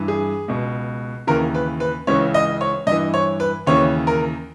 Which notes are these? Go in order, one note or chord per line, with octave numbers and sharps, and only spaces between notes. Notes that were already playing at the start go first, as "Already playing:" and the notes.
Already playing: G2 E3
G#4
C#2 B2
D#2 C#3 E3 A#4
B4
B4
C#2 C#3 E3 C#5
D#5
C#5
G2 E3 D#5
C#5
B4
D#2 C#3 E3 C#5
A#4